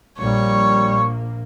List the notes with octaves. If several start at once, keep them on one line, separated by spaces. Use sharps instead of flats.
A#1 G3 A#3 C#5 C#6